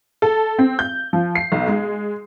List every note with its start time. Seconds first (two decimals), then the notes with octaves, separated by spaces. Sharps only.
0.22 A4
0.59 C4
0.79 G6
1.13 F3
1.35 C7
1.52 B1
1.67 G#3